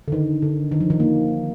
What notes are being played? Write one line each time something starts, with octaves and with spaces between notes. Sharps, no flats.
D3
D#3
D3
D#3
F3
D#3
A#3